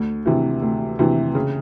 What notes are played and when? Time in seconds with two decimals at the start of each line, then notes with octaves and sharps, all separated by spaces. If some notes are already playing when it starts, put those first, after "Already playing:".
Already playing: D2
0.26 C3 E3
0.62 D2
0.99 C3 E3
1.35 C#3